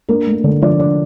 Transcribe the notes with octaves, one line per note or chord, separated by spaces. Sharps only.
A#3 D4 A#4
A3
D3
F3 D4 D5
D4